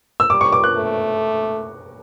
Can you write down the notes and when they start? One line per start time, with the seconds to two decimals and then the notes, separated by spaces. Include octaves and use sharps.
0.20 E6
0.30 G3 D6
0.41 C#6
0.53 D6
0.64 F#6
0.76 A3